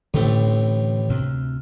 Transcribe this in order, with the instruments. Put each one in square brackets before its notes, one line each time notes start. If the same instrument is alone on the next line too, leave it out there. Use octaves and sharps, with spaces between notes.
[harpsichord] A1 A2 C4 [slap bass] D3 E3 A3
[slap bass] D2 C3